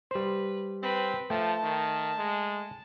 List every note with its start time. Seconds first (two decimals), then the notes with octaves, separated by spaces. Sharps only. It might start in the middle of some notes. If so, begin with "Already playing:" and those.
0.11 G3 B4 C5
0.83 C4 B4
1.30 F3 A3 G5 A5
1.63 D#3
2.18 G#3